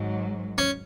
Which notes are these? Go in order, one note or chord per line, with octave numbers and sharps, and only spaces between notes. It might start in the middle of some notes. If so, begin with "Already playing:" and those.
Already playing: G#1 G#2 F#3
C#4